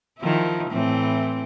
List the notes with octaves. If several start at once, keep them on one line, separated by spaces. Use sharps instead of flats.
D#3 F3 E4
A2 E3 C4